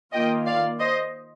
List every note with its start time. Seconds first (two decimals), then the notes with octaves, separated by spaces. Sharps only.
0.13 D#3 A#3 F4 D#5 G5
0.46 D5 F5
0.79 C5 D#5